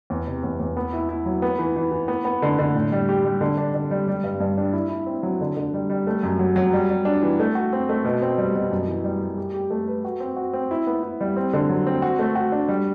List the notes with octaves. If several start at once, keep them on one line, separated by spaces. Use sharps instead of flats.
E2
C3
E2
E2
B3
E4
E4
F#3
B3
E3
E3
E3
B3
B3
D3
D3
A2
G3
G4
G3
D3
D4
D3
G3
G3
G2
G2
D4
E4
E4
C4
F#3
D3
D3
G3
G3
A3
F#2
F#3
F#3
G3
G3
D4
E3
A3
F#4
C4
A3
B2
C4
G3
B2
F#2
E3
G3
G3
G4
G4
A3
B4
F#4
C4
F#4
C4
E4
B3
E4
G3
C4
D3
F#3
C4
F#4
A3
F#4
D4
G3